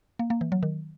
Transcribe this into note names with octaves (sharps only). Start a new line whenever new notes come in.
A#3
A#3
E3
F#3
D#3